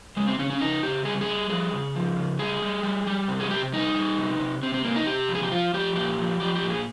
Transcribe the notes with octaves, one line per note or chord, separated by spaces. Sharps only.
C#3 G#3
C4
C#3 C#4
C#4
C#3 D#4
C#3 G4
G3 G#4
G#4
G3
F3 G#4
C#3
F3
C#3
G3 G#4
G3
G3
G3
C3
G#4
C3 G4
G3 D#4
G3
C3
C3
C3 C4
C4
C3 A#3
D#4
C3 G4
F3
G#4
G4
F3 F4
F3 G4
A#2 G4
F3
F3 G4
G4
A#2
G#4